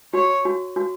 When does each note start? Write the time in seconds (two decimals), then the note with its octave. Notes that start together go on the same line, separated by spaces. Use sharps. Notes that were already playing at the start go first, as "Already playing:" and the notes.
0.14 F#4 C#5
0.45 F#4
0.76 F#4